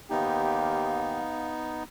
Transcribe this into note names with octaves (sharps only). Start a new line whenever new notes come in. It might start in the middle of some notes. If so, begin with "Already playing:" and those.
D#2 B3 D#4 G4 F5